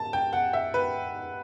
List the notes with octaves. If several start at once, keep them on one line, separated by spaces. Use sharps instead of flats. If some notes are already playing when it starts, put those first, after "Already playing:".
Already playing: A5
G5
F#5
E5
B4